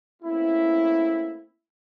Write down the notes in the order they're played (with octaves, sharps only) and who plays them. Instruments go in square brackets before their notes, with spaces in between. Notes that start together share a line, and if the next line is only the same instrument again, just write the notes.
[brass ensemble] A3 A#3 C4 C#4 E4